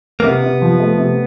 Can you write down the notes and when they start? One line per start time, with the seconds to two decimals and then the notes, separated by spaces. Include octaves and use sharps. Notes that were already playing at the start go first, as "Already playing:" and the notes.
0.20 A#3
0.24 C3 B3
0.43 C3
0.62 F3
0.79 A3
0.97 C3